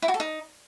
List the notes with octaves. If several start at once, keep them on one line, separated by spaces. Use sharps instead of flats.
E4
F#4
A4
D#4